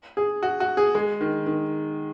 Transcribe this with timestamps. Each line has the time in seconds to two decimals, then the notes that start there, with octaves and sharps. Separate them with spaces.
0.17 G#4
0.43 F#4
0.60 F#4
0.77 G#4
0.95 G#3
1.21 D#3
1.46 D#3